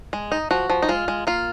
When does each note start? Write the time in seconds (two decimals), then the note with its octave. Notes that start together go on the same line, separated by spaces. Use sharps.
0.13 G#3
0.32 D#4
0.51 F3 F#4
0.70 F3
0.82 D#4
0.89 G#3 F4
1.08 G#3
1.27 A#3 F4